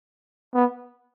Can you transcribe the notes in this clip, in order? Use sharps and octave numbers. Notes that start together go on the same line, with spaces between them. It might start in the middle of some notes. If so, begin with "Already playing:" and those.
B3